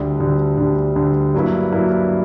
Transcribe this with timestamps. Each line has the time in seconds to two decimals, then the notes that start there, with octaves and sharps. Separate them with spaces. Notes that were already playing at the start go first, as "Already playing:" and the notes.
Already playing: D2 D3 G3
0.20 D2 D3 G3
0.58 D2 D3 G3
0.96 D2 D3 G3
1.34 G2 F#3 A#3 E4 B4
1.72 G2 F#3 A#3 E4 B4